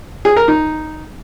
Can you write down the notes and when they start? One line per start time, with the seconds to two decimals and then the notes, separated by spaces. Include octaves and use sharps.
0.25 G#4
0.36 A#4
0.48 D#4